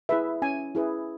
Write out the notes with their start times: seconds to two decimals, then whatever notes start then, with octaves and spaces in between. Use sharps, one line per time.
0.09 E4 G#4 B4 E5
0.42 C#4 G#5
0.75 E4 G#4 B4